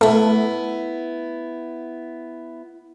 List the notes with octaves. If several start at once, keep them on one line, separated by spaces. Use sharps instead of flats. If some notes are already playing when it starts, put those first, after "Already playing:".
A3 B3 E4